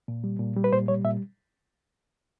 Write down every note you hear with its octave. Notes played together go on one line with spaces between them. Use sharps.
A#2
G3
A#2
G3
B4
A#2 C5
G3 C#5
A#2 E5